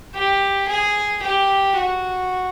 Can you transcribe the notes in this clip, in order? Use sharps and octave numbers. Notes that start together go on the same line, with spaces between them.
G4
G#4
G4
F#4